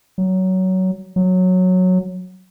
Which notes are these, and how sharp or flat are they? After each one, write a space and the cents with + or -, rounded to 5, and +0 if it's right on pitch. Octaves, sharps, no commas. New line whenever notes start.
F#3 +15
F#3 -10